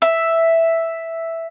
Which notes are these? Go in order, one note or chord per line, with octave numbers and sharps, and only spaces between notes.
E5